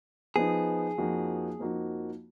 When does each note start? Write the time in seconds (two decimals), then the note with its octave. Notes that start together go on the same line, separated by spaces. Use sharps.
0.36 F3 B3 D#4 G#4
0.98 F2 F3 A#3 D#4 F#4
1.59 F2 F3 A#3 D#4 F#4